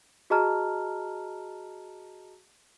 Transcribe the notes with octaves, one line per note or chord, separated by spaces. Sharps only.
F#4 G#4 D#5 A5 A#5 F6